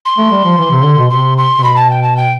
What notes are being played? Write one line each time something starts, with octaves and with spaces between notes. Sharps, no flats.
C6
A3
G3
F3
E3
C3
D3
B2
C3 C6
C6
C3
B2 B5
A5
G5
A5
G5